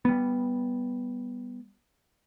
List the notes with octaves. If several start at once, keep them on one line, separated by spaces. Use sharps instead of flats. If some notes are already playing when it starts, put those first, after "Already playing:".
G3 B3